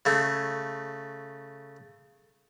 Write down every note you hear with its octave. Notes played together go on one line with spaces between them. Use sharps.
C#3 A3